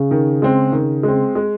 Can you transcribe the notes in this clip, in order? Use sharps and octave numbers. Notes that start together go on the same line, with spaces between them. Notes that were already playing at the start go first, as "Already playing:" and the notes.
Already playing: C#3
D#3
G#3 C4
D#3
G#3 C4
G#3